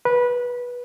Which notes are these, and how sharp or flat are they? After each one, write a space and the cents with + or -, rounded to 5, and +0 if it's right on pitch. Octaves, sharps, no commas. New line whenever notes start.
B4 -20